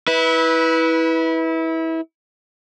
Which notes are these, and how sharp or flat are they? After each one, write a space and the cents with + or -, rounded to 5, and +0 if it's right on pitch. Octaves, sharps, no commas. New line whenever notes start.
E4 -25 B4 -5